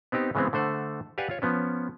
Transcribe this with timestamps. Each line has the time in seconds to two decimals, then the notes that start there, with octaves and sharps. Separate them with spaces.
0.12 B3 C4 D#4 G4
0.35 C#3 E3 G#3 B3 C4
0.53 D3 A3 C5 F#5
1.18 G4 B4 D5 F5 F#5 G#5
1.30 F4 C#5
1.42 F3 B3 C#4